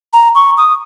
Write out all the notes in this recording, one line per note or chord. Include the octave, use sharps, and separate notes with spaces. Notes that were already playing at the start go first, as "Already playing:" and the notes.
A#5
C#6
D#6